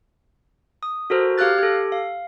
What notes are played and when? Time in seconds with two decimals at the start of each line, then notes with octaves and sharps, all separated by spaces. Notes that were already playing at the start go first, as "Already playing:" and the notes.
0.83 D#6
1.10 F#4 A4 A#4 C5
1.38 G4 F5 F6 F#6 A6
1.58 G4 A4
1.92 F5